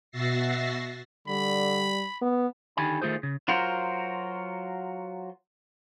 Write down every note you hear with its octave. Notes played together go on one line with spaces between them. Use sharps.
B2 F#4 E5 A6 A#6 C7
D3 G3 B5
B3
D3 D#3 G4 G#5 B5
D#3 A3 F4 G#4 C5
C#3
F#3 F4 F#4 A#4 C5